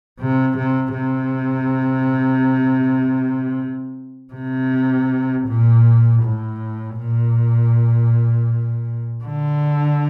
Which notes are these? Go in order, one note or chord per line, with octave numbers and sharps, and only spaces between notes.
C3
C3
C3
C3
A#2
A2
A#2
D3